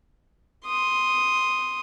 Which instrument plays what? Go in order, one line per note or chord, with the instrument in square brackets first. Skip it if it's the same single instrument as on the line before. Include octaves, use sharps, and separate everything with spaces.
[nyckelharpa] C6 D#6